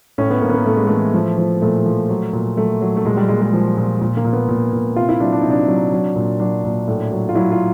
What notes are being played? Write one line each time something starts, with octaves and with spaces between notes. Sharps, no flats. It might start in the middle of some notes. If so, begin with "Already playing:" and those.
A2 C#4
B3
A2 A#3
B3
A#3
A2 A3
G#3
E3 A3
F3
F3
A#2 A3
F3
F#3
A#2
F#3 A3
F#3
A3
A#2 G#3
G3
A#2 G#3
G#3
F3
A#2
A#2
A#3
A#2
B3
A#2
A#2
C3 F4
E4
F#3 D4
D4
C3 D#4
D4
F#3
F#3
A#2
F#3 D4
A#2
A2
F#3
F4
F#3 E4
F4